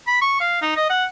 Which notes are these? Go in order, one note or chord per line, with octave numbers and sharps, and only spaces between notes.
B5
C#6
F5
D#4
D#5
F#5